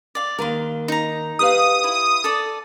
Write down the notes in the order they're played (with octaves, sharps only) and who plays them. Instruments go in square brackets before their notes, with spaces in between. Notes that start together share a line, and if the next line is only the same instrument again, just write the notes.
[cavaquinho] D5 F5
[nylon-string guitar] D#2 D#3 A#4 [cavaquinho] F5 C6
[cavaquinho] D#4 A#5
[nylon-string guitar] G4 B4 F5 [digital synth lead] D#6
[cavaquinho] E4
A4 D5